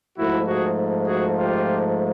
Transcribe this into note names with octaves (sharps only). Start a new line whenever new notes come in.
G#2 F3 A3 E4 F#4
F#4 G#4
F#4 G#4
F4 G4